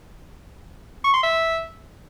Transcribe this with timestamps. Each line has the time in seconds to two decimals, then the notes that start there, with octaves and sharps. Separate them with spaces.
1.04 C#6
1.14 C6
1.23 E5